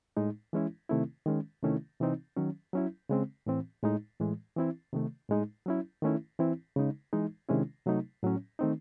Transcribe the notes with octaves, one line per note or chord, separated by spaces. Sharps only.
A2 G#3 D#4
E3 G#3 C#4 E4
C3 D#3 A3 C4 E4
D#3 G#3 C#4
C3 D#3 A3 C#4 E4
C3 E3 C4 D#4
D#3 F#3 C#4
F#3 C#4 E4
C#3 G#3 C4
A2 E3 C4
A2 G#3 D#4
A2 E3 G#3
E3 C4 E4
C3 D#3 A3
A2 G#3 D#4
F#3 C#4 E4
D#3 A3 C#4 E4
E3 C4 E4
C#3 G#3 D#4
E3 G#3 D#4
C3 D#3 G#3 C#4 E4
C3 F#3 A3 D#4
A2 F#3 C#4
D#3 A3 C4 D#4